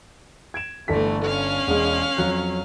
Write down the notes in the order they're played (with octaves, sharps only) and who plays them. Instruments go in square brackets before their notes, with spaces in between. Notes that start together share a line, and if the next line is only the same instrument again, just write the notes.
[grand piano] G#6 D7 E7
[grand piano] G1 A4 B6 [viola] E3 A3
[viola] C#4 F5
[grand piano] E1 G#3
F2 F#3 F#6